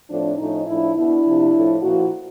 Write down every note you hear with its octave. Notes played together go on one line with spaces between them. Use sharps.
A2 F3 C4 D4
A2 F3 C#4 D#4
A2 F3 D4 E4
B2 D4 E4
C3 F3
A2 F3
A#2 F3 E4 F#4